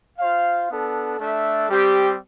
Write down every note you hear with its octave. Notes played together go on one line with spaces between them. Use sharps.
F4 C5 F5
B3 D4 A4
A3 D4 A4 E5
G3 C4 G4